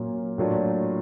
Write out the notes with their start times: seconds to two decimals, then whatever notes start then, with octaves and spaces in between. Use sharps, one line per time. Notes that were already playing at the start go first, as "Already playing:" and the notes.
Already playing: A#2 F#3 A#3 C#4
0.38 A2 F#3 A#3 D4 F4